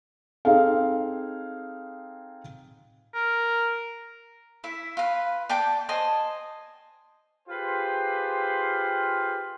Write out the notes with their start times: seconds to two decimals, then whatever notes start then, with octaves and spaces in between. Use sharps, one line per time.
0.45 C4 D#4 G#4 A4 F5
3.14 A#4
4.64 E4 E5
4.97 F4 B4
5.49 D5 G5 A5 D6
5.89 C5 D#5 G#5 A5
7.49 F4 G4 G#4 B4 C5 F5